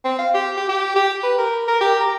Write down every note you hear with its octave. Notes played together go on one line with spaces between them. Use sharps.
C4
F5
G4
G4
G4
G4
B4
A#4
A#4
G4
A#5